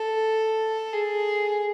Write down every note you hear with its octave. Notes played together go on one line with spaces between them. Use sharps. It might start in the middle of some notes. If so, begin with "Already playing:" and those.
Already playing: A4
G#4